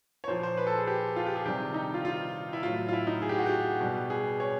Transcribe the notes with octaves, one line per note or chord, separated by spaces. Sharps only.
C#5
A#2 F3 C5
C5
B4
A4
G#4
G4
F4
G4
G#4
C3 D#3 G3 G4
D#4
F4
F4
E4
A2 F#3 F4
F4
E4
D#4
G#4
G4
F#4
G4
B2 G3
G#4
C#5